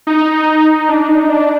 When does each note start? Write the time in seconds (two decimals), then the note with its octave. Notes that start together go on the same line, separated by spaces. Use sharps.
0.07 D#4
0.89 D4
1.09 D#4
1.29 D4